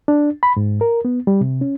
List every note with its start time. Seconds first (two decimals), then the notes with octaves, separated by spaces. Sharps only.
0.08 D4
0.43 B5
0.56 G#2
0.81 A#4
1.05 B3
1.27 G3
1.41 C3
1.61 C#4